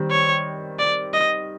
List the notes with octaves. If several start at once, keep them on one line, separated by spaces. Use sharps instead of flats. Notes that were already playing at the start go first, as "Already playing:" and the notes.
Already playing: D#3 G3 C4
C#5
D5
D#5